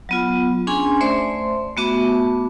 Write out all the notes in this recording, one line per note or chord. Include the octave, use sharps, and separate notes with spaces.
F#3 B3 F4
C#4 D4 G#4 G#5 C6
A3 C5 D5 E5 C6
A3 B3 F#4 E5 A5 D6